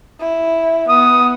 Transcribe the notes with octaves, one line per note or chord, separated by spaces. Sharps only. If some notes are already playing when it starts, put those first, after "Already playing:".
E4
B3 D#6